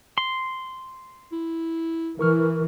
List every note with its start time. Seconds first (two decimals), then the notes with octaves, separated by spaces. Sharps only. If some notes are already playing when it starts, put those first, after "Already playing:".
0.18 C6
1.32 E4
2.19 E3 E4 A#4 C#6 F6